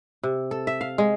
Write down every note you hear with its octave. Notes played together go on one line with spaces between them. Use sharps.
C3
A4
E5
F5
G#3